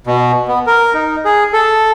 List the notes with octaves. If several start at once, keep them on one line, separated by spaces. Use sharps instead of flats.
B2
B3
A#4
D#4
G#4
A4